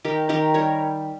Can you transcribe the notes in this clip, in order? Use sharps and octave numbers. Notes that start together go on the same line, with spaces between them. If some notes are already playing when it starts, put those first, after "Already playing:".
D#3 G4 A#4
D#3 G4 A#4
G3 A#4 C#5